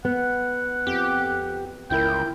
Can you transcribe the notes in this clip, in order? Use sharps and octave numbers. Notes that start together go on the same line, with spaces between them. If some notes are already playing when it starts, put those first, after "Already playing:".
B3 F#5
F2 G4
G1 C#2 E4 A#4 G5